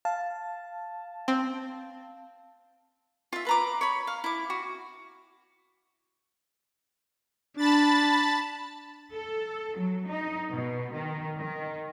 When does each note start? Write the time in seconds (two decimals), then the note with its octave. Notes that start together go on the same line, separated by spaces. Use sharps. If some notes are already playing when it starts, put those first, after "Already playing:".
0.05 F5 A5
1.28 C4
3.33 F4 E5
3.46 B4 A#5 D6
3.81 C#5 B5
4.07 F5
4.24 E4 D6
4.50 F#4
7.57 D4 A5 B5 A6
9.13 A4
9.76 F#3
10.08 D#4
10.51 B2
10.93 D#3
11.38 D#3